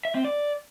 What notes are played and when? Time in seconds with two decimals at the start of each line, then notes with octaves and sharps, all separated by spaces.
0.05 E5
0.15 C4
0.25 D5